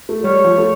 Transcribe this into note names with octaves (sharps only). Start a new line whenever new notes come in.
A3
G3 C#5
F3
A3